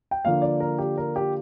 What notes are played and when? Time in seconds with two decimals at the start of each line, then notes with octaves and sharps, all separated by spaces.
0.11 G5
0.25 D3 F3 A#3 D4 F5
0.42 D5
0.60 A#4
0.78 G4
0.97 A#4
1.16 G4